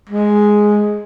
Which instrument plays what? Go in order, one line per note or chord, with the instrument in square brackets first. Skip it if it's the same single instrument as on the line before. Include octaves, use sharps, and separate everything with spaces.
[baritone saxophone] G#3